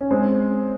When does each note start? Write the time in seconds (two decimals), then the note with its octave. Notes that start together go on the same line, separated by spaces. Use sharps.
0.01 C#4
0.11 G#3 C4